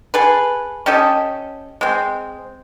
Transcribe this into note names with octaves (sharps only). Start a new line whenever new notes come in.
G#4 A4 B4
C#4 G4 A4 D#5
G#3 C4